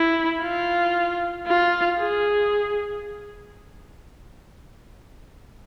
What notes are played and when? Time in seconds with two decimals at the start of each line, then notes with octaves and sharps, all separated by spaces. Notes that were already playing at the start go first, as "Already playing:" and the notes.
Already playing: E4
0.42 F4
1.47 F4
1.99 G#4